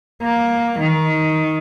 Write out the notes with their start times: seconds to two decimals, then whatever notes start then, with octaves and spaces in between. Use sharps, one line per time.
0.23 A#3
0.79 D#3